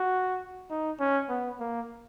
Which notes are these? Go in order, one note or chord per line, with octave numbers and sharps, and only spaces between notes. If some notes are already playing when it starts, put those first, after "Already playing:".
Already playing: F#4
D#4
C#4
B3
A#3